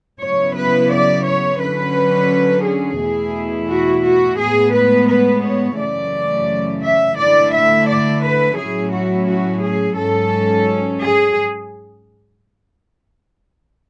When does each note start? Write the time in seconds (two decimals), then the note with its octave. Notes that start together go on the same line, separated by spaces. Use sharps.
0.21 C#3 F#3 B3 E4 C#5
0.56 B4
0.91 D5
1.26 C#5
1.60 D3 F#3 C#4 B4
2.65 G#4
3.00 E2 B2 A3 E4
3.70 F#4
4.05 F#4
4.39 A2 G#3 B3 G#4
4.74 B4
5.09 B4
5.44 C#5
5.78 F#2 C#3 E3 A3 C#4 D5
6.83 E5
7.17 D3 A3 E4 D5
7.53 E5
7.87 D5
8.22 B4
8.57 A2 F#3 C#4 E4 G#4
8.92 F#4
9.27 F#4
9.62 G#4
9.96 G#2 F#3 C#4 A4
11.01 G#4